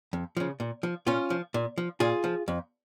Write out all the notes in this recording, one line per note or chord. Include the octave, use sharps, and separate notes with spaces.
F2
C#3 F3
A#2
F3
A#2 C#4 F4
F3
A#2
F3
A#2 F4 G#4
F3
F2